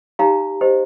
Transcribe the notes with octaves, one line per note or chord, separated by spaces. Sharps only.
D#4 G4 C#5 F5 A#5
G4 C5 D#5